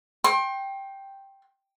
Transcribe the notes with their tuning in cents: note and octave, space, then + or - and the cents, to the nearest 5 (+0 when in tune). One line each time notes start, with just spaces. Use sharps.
G5 +0 C6 +35